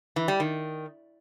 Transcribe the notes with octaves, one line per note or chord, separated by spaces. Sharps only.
E3
G3
D#3